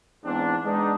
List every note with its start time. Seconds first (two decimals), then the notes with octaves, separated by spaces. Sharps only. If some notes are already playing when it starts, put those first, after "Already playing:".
0.25 E2 G#2 C4 D4
0.65 G#3 B3 D4 D#4